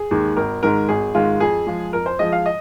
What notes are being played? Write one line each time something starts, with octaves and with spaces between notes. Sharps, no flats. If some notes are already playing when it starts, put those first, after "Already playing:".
Already playing: G#4
D#2 D#3 G#3
G#1 A#4
G#2 D#3 G#3 A#4
G#1 G#4
G#2 D#3 G#3 F4
F2 G#4
F3 G#3
F2 A#4
C5
F3 G#3 D#5
F5
D#5